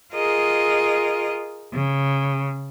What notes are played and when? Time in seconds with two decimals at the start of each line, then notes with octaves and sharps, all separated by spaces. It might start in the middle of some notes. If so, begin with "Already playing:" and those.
0.13 F4 G#4 A#4 D#5
1.72 C#3